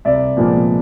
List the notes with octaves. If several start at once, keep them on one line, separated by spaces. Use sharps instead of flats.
C2 D5 E5
A#2 F3 G#3 B3